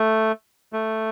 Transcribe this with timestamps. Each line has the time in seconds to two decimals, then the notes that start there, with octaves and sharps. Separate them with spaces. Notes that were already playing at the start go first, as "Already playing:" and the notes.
Already playing: A3
0.73 A3